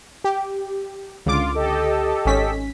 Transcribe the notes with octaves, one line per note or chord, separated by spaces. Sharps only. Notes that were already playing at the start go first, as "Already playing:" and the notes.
G4
C#2 D3 F4 D6
G4 A4 D#5
G#1 C#4 B6